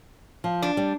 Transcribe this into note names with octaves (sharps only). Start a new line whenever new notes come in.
F3
D4
G3